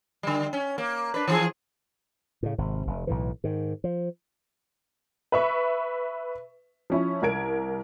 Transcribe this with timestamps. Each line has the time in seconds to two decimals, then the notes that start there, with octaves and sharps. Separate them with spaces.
0.23 D3 G3
0.53 C#4
0.78 A#3
1.14 D4 B4
1.28 E3 F3 G#4
2.43 A2 C#3
2.58 G#1 C3
2.87 F1
3.07 B1 A2 E3
3.44 G#2 D#3
3.84 F3
5.32 B4 E5 C#6
6.90 F3 C#4 E4
7.22 C2 A#4 G#6 D7